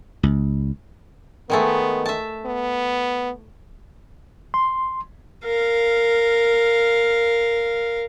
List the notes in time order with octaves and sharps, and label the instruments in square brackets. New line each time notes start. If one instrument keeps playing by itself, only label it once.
[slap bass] C#2
[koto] D#3 G#3 A3 [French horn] B3
[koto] E5 A5
[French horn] B3
[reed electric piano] C6
[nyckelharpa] A#4 F5